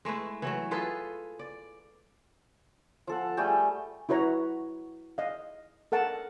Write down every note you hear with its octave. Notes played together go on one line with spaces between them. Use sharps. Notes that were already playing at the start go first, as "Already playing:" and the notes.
G#3 A3 E4 B4
E3 F#3 A3
F4 G#4 A4 B4
D5
F3 A4 F#5
G3 A3 G#4 G5
E4 F#4 B4 C#5 A#5
D#5 F5
A4 A#4 F#5 A5